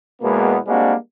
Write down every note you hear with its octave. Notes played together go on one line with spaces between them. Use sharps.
E2 B2 G#3 A#3 B3
G3 G#3 A#3 C4 D4 F#4